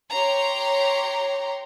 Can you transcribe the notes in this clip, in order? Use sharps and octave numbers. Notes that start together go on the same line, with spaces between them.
G4 C#5 A#5 C6